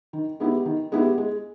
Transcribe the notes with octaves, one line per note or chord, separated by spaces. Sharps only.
D#3
G#3 B3 E4 G4
D#3
G#3 B3 E4 G4
G#3